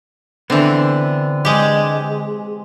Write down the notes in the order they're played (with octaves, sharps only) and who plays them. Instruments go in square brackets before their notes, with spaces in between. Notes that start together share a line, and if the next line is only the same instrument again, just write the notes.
[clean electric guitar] D3 B3 [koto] E3 C4
[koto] G#3 G4